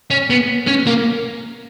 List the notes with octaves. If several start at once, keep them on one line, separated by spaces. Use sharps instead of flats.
C#4
B3
C#4
A#3